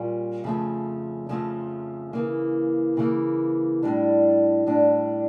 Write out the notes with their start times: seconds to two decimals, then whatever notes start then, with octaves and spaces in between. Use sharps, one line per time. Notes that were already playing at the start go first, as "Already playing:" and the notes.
Already playing: A#2 G3 C#4 F4
0.44 F2 C#3 F3 A3 C#4
1.29 F2 C#3 F3 A3 C#4
2.13 C#3 E3 A#3
2.97 C#3 E3 A#3
3.83 A2 G3 D4
4.67 A2 G3 D4